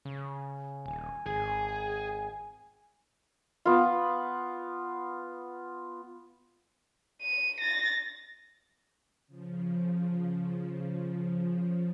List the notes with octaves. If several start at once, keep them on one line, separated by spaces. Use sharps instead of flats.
C#3
D#1 G#5
G#1 G#4
B3 F4
D#7
A6 A#6
C#3 F3